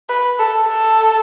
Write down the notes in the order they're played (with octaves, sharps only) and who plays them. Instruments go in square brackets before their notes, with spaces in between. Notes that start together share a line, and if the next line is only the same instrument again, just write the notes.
[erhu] B4
A4
A4